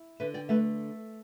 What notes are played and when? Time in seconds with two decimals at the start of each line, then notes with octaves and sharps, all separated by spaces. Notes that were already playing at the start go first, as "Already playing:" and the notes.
Already playing: E4
0.20 D3 B4 E5
0.34 D5 G5
0.49 A3 B4 E5